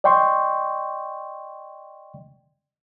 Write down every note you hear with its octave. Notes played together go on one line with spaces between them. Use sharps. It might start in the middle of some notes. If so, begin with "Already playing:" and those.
D5 D#5 G5 C6 C#6